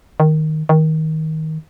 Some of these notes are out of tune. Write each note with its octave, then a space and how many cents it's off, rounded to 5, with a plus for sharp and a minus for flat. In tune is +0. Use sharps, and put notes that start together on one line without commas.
D#3 +0
D#3 +20